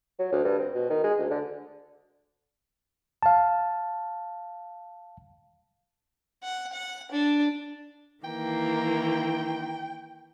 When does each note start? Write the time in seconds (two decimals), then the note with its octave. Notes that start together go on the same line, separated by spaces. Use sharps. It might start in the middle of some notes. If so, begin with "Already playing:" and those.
0.19 F#3
0.32 D2
0.44 G2
0.59 C4
0.74 B2
0.90 D#3
1.04 G#3
1.19 D2
1.31 D3
3.23 F5 A5
6.43 F#5
6.72 F#5
7.11 D4
8.24 D#3 E3 A#3 G5